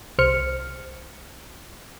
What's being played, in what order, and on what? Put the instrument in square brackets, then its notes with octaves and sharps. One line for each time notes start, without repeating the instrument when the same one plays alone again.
[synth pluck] C2 C5 F6 C#7